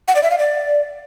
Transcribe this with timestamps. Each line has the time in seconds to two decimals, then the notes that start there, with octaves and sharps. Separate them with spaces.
0.08 F#5
0.15 D5
0.23 E5
0.31 F5
0.38 D5